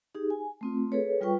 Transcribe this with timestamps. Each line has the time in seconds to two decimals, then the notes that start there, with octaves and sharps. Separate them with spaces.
0.15 D#4 G4 G#4
0.30 G#5
0.61 A3 C4 F4
0.92 G#4 A4 B4 C#5
1.21 G3 F4 B4 G5 C#6